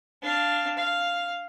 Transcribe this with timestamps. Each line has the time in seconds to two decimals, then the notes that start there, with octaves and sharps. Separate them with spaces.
0.22 D4 F5
0.77 F5